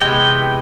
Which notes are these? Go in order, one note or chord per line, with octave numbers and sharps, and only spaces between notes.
C3 E3 G#3 B3 G5